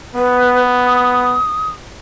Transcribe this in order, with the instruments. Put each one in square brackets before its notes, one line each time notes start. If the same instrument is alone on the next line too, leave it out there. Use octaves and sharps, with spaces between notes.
[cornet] B3 [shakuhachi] B4
[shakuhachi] D#6